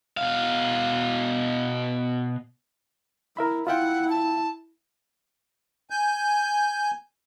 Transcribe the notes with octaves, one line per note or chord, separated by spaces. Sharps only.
B2 F5
E4 A#4 E5 B5
E4 F4 E5 F#5 G5
A5
G#5 G6